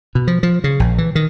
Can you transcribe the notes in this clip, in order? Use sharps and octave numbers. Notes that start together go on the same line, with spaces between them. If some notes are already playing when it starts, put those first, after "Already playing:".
B2
F3
F3
C#3
A#1
E3
D#3